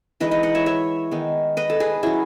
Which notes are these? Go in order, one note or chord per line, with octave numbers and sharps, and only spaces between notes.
E3 G#3 D#4 B4 D#5
B4 D#5
D#5 F#5
C#5 E5
C#5 E5
D#3 G#3 B3 D#4
B4 D#5
A4
G#4 B4
F#3 C#4 E4 G#4